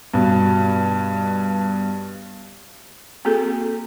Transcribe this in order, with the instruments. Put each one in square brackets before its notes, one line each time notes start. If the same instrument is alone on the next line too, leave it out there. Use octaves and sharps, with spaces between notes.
[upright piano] G2 B2
[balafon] A#3 C4 F#4 G#4 A4